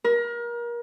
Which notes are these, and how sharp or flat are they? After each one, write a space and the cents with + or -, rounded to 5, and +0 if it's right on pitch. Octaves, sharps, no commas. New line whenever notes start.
A#4 +30